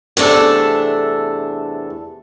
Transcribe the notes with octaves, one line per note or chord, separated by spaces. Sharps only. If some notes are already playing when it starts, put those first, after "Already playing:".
E2 C3 A3 D4 A4